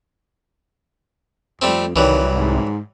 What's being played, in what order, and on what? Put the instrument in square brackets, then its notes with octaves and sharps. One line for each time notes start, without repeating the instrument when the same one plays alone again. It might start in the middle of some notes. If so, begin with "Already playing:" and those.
[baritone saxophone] F2 [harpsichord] G3 A3 C4
[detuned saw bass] C2 [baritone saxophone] D#3 [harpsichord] E3 F#3 G3
[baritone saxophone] G#2